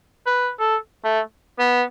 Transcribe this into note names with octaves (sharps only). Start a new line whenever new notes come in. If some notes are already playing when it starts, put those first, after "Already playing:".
B4
A4
A3
B3